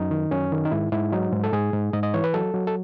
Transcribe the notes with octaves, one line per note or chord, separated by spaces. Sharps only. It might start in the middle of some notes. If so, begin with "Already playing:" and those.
Already playing: F#2 D#4
D#3
F#2 C#4
D#3
D#4
G#2 E4
G#2 E4
F#3 D#4
G#2
A4
G#2 G#4
G#2
G#2 D#5
D#5
E3 C#5
B4
F#3 A4
F#3
A4